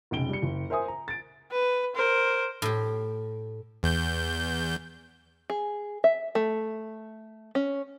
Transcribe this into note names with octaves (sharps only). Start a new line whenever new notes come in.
F1 B1 C#3 D7 G7
G3 C#7
F#1
A#4 C5 E5 G#5 D#6
A#5
A6 D7
B4
A#4 C5
A2 G4
E2 G6
G#4
E5
A3
C#4